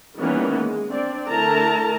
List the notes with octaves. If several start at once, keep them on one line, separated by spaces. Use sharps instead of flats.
D#3 E3 G3 A#3 B3 C#4
G#3
C4 D4 D5
D3 A3 E4 A#4 A5 A#5